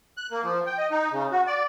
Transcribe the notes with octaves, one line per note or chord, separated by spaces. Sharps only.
F#6
A#3
F3
G5
D#5
D#4
C#3
F#4
D5